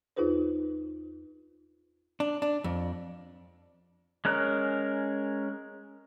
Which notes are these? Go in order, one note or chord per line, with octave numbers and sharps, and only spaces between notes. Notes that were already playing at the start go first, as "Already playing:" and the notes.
E2 D#4 F4 G#4 B4 C5
D4
D4
F2
G#3 C#4 A#4 F#6